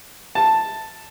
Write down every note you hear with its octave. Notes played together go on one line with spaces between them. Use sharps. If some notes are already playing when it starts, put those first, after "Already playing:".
A5